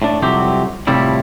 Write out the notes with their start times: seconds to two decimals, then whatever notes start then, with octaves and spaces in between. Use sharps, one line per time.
0.02 A2 D4
0.22 C2 F2 C3 F#3 C4 G4
0.87 A2 C3 F3 G3 E4